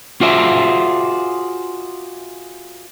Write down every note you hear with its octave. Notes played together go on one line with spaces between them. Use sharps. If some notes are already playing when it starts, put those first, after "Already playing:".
F4 F#4 G#4 C5 D5 E5